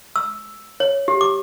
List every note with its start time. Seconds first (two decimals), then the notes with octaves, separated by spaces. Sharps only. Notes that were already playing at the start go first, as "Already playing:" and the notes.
0.16 E6
0.80 C#5
1.08 G4
1.21 D6